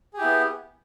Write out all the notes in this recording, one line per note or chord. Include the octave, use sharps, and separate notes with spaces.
B3 E4 G4 G#4